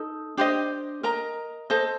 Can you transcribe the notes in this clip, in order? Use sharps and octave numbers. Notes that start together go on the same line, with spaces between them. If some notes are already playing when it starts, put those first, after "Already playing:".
Already playing: D#4 A4
D4 G4 C5 D#5
A#4 D#5 A#5
A4 C5 D#5